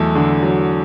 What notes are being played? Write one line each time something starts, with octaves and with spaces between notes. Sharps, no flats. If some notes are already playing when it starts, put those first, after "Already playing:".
Already playing: E2 F#3 A3
D3
F#3